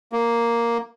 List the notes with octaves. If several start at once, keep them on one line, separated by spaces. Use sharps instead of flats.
A#3